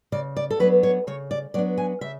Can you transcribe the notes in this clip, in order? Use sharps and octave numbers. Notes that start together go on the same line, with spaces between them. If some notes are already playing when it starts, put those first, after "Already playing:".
C#3 D5
D5
A4
F#3 B3 D4 B4
C#5
C#3 C#5
D5
F#3 B3 D4 D5
G#5
C#3 E5